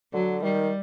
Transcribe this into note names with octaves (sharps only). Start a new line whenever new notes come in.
D3 F#3
D#3 G3